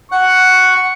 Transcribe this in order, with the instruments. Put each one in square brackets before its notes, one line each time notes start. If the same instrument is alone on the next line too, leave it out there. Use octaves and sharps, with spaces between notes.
[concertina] F#5 F#6 [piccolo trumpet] C#6